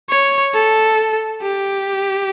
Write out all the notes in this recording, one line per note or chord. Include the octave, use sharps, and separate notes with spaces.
C#5
A4
G4